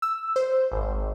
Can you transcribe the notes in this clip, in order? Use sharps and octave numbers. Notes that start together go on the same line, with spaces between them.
E6
C5
G#1